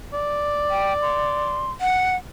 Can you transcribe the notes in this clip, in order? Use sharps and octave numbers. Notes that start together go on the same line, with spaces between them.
D5
G5
C6
F#5